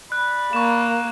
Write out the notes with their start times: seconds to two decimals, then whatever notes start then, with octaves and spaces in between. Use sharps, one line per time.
0.12 D5 B5 F#6
0.53 A#3 C#6 E7